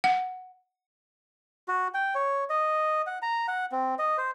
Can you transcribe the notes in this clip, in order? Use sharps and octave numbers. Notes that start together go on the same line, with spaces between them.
F#5
F#4
G5
C#5
D#5
F#5
A#5
F#5
C4
D#5
C5